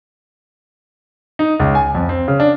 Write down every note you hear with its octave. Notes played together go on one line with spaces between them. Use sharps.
D#4
C#2
G#5
F2
C4
C#3
D4